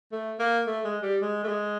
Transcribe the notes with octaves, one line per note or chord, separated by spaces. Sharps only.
A3
A#3
A3
G#3
G3
G#3
A3
G#3